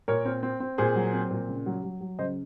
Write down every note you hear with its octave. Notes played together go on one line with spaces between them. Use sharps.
A#2 A#4 C#5
C4
C4
C4
A#2 G#4 C5
F#3
C4
A#2
C#3
F#3
F#3
F#3
C#3 C5 D#5